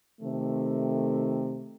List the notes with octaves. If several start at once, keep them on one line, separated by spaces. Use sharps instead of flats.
C3 D#3 A3